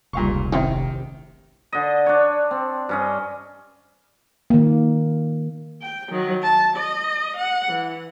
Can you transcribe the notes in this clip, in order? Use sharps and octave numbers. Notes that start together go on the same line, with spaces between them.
F1 C#2 A#2 G3 F5 C#6
A#1 C3 D#3 C4 C#4 E4
D3 D#5
D4 C#5
C4
G2 C#4 D#5
D#3 A#3
G5
D#3 F#3
A5
D#5
F#5
E3